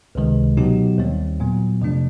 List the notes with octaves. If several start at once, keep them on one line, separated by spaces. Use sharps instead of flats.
C#2 C3 D#3 G#3
B2 F#3 B3 D#4 G4
D#2 D#3 G3 C4
A#2 F#3 B3
F2 C3 F3 A3 D4